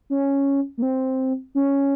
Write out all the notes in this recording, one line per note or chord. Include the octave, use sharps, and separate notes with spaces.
C#4
A#3
C4
C#4